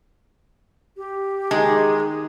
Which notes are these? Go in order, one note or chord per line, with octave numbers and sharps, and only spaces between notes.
G4
D#3 G#3 D#4 G#4